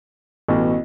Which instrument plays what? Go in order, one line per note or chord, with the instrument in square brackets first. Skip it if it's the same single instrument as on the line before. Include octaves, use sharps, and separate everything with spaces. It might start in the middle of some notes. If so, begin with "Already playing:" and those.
[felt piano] A1 [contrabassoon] B2